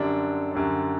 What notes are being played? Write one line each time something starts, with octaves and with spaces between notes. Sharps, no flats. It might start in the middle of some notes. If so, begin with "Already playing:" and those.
Already playing: F#2 D3 G3 D4
F#2 D3 G3 D4